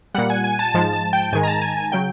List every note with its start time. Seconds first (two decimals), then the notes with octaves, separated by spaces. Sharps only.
0.14 A#2 G3 F#5
0.30 G#5
0.44 G#5
0.59 A5
0.74 G#2 F3 G#3 A5
0.93 A5
1.13 G5
1.32 G#2 D#3 G#3 G#5
1.43 A#5
1.48 A5
1.62 G#5
1.77 G#5
1.92 C#3 F#3 G5